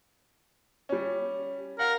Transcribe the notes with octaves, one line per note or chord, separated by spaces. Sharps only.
G3 C#4
A#4 F5 F#5